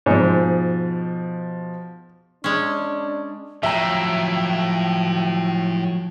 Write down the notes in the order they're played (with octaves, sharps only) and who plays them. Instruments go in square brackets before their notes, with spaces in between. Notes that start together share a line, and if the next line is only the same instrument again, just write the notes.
[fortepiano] G#2 [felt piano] B2 F3
[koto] G#3 C#4 [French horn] D4
[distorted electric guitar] A2 [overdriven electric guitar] F3 F#3 [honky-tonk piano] E5 A#5 [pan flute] G5